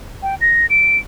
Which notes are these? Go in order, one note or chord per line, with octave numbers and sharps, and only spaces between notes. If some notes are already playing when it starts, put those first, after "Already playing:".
G5
A#6
D7